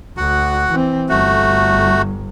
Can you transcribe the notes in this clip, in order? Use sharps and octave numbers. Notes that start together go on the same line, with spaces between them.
D2 F#4 F#5
E3 C4
G1 A3 F#4